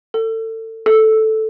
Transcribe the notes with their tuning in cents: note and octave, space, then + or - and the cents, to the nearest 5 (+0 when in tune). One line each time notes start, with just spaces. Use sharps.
A4 +30
A4 -5